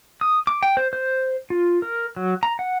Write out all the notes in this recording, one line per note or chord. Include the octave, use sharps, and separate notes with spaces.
D#6
D6
G5
C5
C5
F4
A#4
F#3
A#5
F#5